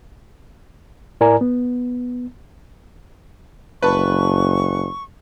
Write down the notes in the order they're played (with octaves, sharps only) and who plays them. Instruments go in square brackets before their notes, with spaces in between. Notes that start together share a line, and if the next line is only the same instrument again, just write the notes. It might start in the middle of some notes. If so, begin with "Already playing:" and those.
[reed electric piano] A2 E4 A#4 D5 G#5 A#5
B3
[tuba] F#1 [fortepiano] B4 A5 [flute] C#6